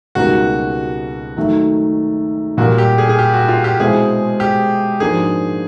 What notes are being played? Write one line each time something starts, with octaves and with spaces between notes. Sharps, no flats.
C#2 B2 G3 A#3 D#4 F#4
D#3 F#3 A3
A#2 G3 A#3 F#4
G4
G#4
G#4
G4
F#4
F4
G4
B2 G#3 C4 E4 G#4
G4
G#2 F3 A#3 D4 F#4 G#4